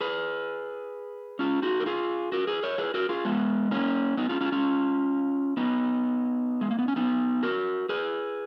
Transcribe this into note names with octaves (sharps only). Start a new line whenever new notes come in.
G#4 B4
C#4 F4
D#4 F#4
A#4
F4 G#4
F#4 A#4
G#4 B4
A#4 C#5
G#4 B4
F#4 A#4
F4 G#4
G#3 B3
A#3 C#4
B3 D#4
C#4 F4
C#4 F4
C#4 F4
B3 D#4
G#3
A#3
B3
C#4
B3 D#4
F#4 A#4
G#4 B4